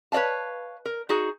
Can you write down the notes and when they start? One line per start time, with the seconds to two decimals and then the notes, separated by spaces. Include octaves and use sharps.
0.12 B4 C#5 D5 F5 A5
0.85 A#4
1.09 D#4 F#4 G#4